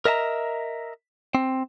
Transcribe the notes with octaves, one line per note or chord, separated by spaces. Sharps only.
A#4 D#5 E5 A5 A#5
C4